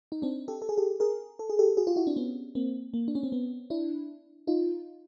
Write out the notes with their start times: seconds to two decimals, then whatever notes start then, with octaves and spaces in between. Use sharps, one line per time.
0.12 D#4
0.22 C4 D4
0.48 G4 A4
0.62 A4
0.69 G#4
0.77 G4 A4
1.00 G#4 A#4
1.39 A4
1.50 G#4
1.59 G4 A4
1.77 F#4 G#4
1.87 F4 G4
1.96 E4 F#4
2.07 C4 D4
2.16 B3 C#4
2.55 A#3 C4
2.94 A#3
3.08 D4
3.15 C#4
3.23 C4
3.32 B3
3.70 D4 E4
4.47 D#4 F4